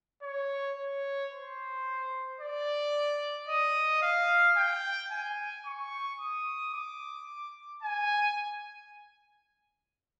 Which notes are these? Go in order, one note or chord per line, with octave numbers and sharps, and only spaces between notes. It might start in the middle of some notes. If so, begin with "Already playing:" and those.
C#5
C#5
C5
D5
D#5
F5
G5
G#5
C#6
D#6
D6
G#5